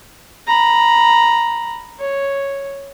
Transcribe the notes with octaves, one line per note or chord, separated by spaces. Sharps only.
A#5 B5
C#5